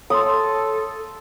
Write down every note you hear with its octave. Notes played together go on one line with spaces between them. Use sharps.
A4 C#5 A5 C6 D#6